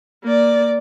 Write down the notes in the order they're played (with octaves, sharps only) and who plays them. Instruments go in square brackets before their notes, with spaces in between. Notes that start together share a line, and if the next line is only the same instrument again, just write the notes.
[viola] A#3 D5